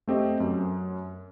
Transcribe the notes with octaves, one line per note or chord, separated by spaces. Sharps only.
A3 C4 G4 D#5
F#2